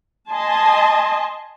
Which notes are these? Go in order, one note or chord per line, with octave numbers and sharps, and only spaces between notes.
D#5 G#5 A5 C6